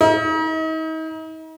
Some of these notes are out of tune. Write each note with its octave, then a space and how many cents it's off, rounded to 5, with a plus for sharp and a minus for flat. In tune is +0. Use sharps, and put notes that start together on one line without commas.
D#4 +40